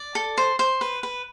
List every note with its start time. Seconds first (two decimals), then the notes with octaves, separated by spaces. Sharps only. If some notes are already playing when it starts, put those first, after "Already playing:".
Already playing: D5
0.15 A4
0.38 C5
0.59 C5
0.81 B4
1.03 B4